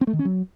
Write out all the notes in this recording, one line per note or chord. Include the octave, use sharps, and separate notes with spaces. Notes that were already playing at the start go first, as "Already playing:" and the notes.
C4
A3
D#3
C#4
F#3